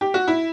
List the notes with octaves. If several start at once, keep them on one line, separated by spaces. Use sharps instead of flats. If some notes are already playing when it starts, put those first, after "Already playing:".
G4
F#4
E4